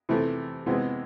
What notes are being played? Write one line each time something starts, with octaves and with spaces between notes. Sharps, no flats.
C3 E3 A3
C3 E3 G#3 B3